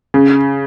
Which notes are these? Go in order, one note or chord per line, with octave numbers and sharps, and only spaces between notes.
C#3